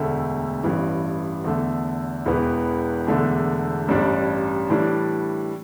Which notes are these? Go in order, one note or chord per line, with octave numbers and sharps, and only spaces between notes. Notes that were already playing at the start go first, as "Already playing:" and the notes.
Already playing: E1 D2 D3 A3
A1 G2 E3
E2 D3 A3
E1 E2 E3 B3
E1 E2 D3 A3 D4
A1 G2 G3 D4
A2 E3 G3 D4